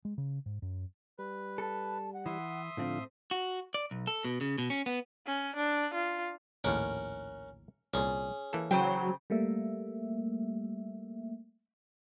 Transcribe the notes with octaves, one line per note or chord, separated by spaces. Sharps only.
G#3
C#3
G#2
F#2
G3 B4
A4 A5
F#5
E3 E5 C6 D#6
A2 D3 F3 C4 F5
F#4
D5
B1
A4
B2
C#3
B2
C#4
B3
C#4
D4
F4
A#1 D#2 A2 C#4 A#4 F#5
C2 A#2 C#4 G#4
E3 A#3 A4
C#3 F#3 C5 G5
G3 A3 A#3 E5